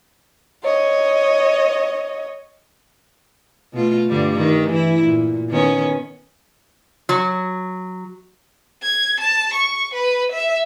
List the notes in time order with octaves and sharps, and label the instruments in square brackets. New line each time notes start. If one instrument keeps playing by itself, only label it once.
[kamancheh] C#5 D#5
[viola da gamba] B2 A3 F4
G2 D3 G3
D#3
E3 E4
A#2
D#3 B3 C#4
[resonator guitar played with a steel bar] F#3
[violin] G#6
A5
C#6
B4
E5